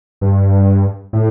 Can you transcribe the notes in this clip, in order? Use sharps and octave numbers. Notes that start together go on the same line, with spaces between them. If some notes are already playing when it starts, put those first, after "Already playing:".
G2
A2